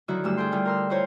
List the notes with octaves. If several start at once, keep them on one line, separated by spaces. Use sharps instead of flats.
D3 D#3 F#3 D#4 E4 F#4
D2 G2 E6
G#4 A4 G5 C6
D3 G3 E4 F4
A#4 C6 E6
E4 F4 A#4 C5 C#5